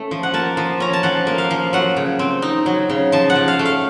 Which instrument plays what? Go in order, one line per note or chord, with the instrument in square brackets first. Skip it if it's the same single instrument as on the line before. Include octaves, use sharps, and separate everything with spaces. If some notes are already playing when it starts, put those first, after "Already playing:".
Already playing: [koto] A3 C#4
F3
F#5
A#3 A5
F3
C#4 A#5
A5
F3 F#5
A#3
F5
F3
F#3 F#5
C#3
C4
D#4
F#3
C#3
F3 A5
F#5
C#3
F5
A3
F5